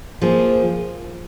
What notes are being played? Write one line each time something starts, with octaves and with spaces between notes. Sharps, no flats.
F3 A#3 F4 G#4